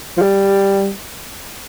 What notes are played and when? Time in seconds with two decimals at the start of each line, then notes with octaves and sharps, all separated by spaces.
0.17 F3
0.22 G3